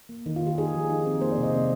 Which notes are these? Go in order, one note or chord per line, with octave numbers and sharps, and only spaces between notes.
A#3
D#3 D#4
F4
D#3
G4
D#4 G#4
F3
D#4
C4
A#3 C5
D5
C3
D#5
C4 D#5